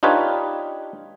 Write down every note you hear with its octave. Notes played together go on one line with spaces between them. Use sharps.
D4 D#4 F4 G4 B4 C#5